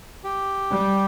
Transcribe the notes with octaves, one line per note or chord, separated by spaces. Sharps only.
G4
G3